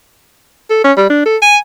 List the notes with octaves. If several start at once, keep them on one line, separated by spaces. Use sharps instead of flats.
A4
C#4
G3
D4
A4
G#5